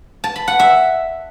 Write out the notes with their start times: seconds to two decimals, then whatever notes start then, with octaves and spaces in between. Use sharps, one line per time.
0.24 A5
0.36 B5
0.48 F#5
0.59 E5